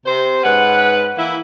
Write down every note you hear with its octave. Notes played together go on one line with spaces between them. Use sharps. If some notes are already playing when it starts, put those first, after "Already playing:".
C3 C5
G#2 C#4 B4 F#5
E3 A#3 E4